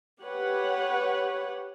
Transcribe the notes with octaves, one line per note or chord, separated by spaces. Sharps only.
G4 B4 C#5 F#5